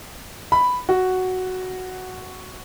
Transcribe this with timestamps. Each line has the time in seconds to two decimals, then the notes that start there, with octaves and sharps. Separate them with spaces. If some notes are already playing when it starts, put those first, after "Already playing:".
0.52 B5
0.89 F#4